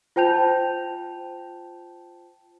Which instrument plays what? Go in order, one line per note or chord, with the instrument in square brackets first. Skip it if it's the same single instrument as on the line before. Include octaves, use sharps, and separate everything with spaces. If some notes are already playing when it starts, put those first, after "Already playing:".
[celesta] F4 C5 G5 A5 G6 F7